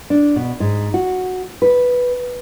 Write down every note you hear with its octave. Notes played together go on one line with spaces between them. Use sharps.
D4
B2
G#2
F#4
B4